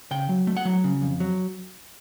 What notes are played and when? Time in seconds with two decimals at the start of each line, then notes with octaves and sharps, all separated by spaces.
0.11 C#3 G5
0.29 F#3
0.47 A3
0.57 F#5
0.65 F#3
0.84 C#3
1.02 F2
1.20 F#3